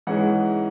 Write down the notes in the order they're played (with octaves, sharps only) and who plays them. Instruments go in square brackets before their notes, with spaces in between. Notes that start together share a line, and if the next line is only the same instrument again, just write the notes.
[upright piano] G#2 E3 G#3 C#4 F#5